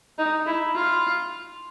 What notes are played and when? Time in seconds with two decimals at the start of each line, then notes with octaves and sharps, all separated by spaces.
0.18 D#4
0.46 E4
0.75 F4